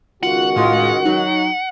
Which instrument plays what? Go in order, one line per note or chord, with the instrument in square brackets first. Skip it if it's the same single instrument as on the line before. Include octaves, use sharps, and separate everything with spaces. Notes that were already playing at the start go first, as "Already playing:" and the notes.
[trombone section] C#2 D#3 F#4 [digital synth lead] F4 [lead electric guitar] F#5
[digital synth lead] A2 [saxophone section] G#3 F4
[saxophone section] F#3 [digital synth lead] D#4